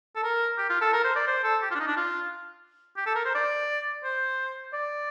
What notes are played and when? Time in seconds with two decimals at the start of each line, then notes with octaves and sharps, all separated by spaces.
0.16 A4
0.23 A#4
0.58 G4
0.70 F4
0.81 A4
0.93 A#4
1.04 C5
1.16 D5
1.27 C5
1.44 A4
1.62 G4
1.71 F4
1.75 D4
1.80 D#4
1.87 D4
1.97 F4
2.97 G4
3.07 A4
3.16 A#4
3.25 C5
3.35 D5
4.04 C5
4.73 D5